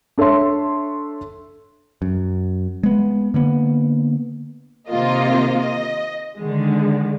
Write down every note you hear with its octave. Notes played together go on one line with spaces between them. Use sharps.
D4 A4 C#5 E5 C6
F#2
G#3 B3
D3 A#3 B3
C3 D#3 A#3 F4 D#5
D#5
D3 D#3 G#3